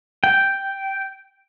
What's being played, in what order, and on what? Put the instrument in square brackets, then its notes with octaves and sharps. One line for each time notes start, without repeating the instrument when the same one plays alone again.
[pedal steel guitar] G5